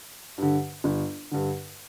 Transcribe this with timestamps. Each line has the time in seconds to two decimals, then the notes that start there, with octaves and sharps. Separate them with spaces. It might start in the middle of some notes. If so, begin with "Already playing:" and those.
0.38 G2 D3
0.84 G1
1.31 G2 D3